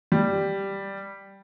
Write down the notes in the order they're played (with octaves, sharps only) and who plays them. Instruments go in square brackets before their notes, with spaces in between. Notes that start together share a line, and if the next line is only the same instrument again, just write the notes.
[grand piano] G3